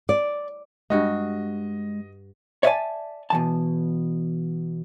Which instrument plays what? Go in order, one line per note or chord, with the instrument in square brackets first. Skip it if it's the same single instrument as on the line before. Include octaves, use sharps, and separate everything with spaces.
[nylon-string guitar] D5
[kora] G2 F#4 F5 [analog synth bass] G#3 [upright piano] D#5
[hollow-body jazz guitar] C#5 D5 E5 F5 G#5 A5
B2 E3 A5